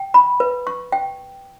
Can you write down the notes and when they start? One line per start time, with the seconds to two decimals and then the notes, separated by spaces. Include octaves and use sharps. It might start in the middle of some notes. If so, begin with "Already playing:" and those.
Already playing: G5
0.14 B5
0.40 B4
0.67 C#6
0.92 G5